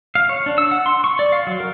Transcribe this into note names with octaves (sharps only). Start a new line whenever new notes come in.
F5
C#5
D4
E6
F#5
C6
C#6
D5
F5
F#3
A#4